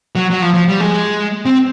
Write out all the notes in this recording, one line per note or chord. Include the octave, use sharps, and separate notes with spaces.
F#3
F#3
F3
F3
G3
G#3
C4